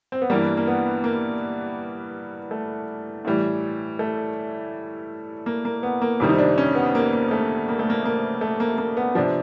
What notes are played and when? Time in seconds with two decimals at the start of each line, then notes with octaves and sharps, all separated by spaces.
0.12 C4
0.22 B3
0.30 G2 E3 G3 A#3
0.57 A#3
0.67 B3
1.04 A#3
2.51 A3
3.25 A2 E3 G3
3.99 A3
5.46 A#3
5.65 A#3
5.83 B3
6.02 A#3
6.20 F2 C3 D#3 G3
6.29 D#4
6.38 D4
6.58 C#4
6.75 B3
6.95 A#3
7.13 A#3
7.31 A3
7.68 A#3
7.79 A3
7.90 A#3
8.05 A#3
8.41 A3
8.60 A#3
8.78 A#3
8.97 B3
9.15 C3 F3 D4